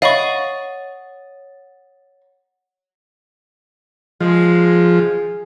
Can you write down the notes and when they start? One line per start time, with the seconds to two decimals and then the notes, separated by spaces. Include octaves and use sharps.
0.02 C#5 D#5 F5 F#5 B5 C#6 A6
4.20 F3 G#3